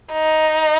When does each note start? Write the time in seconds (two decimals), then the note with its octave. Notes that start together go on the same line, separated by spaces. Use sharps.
0.13 D#4